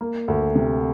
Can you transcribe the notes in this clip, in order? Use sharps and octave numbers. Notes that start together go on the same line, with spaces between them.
A#3
D2
C3